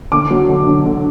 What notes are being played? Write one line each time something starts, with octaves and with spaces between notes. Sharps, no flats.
D3 D6
F#3
D3
D3
D3